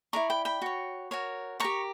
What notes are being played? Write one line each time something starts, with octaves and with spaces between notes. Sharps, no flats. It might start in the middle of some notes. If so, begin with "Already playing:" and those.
E4 B4 D5 A#5 C#6
G5 B5
G5 B5
F#4 C#5
F#4 A#4 C#5
G4 A#4 C#5 A#5 C#6